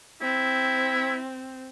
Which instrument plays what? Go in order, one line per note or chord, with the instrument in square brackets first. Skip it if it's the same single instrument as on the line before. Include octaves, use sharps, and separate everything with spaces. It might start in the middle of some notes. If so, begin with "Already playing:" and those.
[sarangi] C4 [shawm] E4